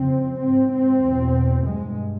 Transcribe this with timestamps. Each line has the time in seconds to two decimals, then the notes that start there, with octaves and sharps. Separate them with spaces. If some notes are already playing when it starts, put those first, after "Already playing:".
Already playing: F2 C#3 C4
0.40 G#2 C4
0.72 C4
1.03 E2 B2
1.66 G2 G#3